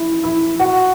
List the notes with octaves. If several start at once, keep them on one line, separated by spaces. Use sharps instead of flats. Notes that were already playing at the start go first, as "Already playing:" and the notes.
Already playing: E4
E4
F#4